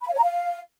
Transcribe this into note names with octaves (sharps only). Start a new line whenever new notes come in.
B5
F5
C#5
A#5
F5